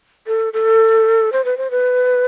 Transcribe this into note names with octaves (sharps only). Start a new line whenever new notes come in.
A4
A4
C5
B4
C5
B4